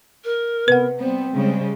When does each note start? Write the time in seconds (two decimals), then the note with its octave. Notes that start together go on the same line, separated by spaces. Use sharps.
0.24 A#4
0.68 C3 B3 B4 F#5
0.98 G3 B3 C4 C5
1.35 C#3 G3 G#3